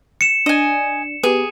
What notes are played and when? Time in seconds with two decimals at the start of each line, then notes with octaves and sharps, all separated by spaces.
0.21 C#7 E7
0.46 D4 D#5 G#5
1.23 B3 G4 G#4